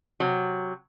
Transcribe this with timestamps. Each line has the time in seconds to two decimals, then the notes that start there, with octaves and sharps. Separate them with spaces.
0.20 C3 F#3